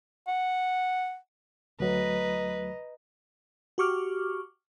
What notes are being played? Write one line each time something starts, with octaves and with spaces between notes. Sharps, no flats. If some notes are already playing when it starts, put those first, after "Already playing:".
F#5
D2 F#3 A3 B4 D#5 A#5
F#4 G4 C#6 D6 F6